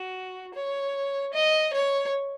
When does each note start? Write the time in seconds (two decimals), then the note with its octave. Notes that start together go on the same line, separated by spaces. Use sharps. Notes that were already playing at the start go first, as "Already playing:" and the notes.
Already playing: F#4
0.54 C#5
1.33 D#5
1.73 C#5